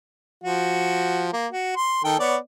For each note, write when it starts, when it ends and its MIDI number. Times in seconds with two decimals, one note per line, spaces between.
0.44 1.31 53
0.44 1.31 66
1.33 1.47 58
1.52 1.75 66
1.76 2.01 84
2.04 2.17 51
2.04 2.17 69
2.04 2.17 79
2.19 2.37 59
2.19 2.37 73
2.19 2.37 74